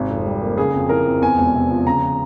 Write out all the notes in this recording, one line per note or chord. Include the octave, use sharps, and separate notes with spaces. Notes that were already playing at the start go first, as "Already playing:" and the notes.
Already playing: G#1 C3
F2
G3
A#3
C#3 G#4
F2
E3 A#4
F2
E2 G#5
E1
C3
F3
C#3 A#5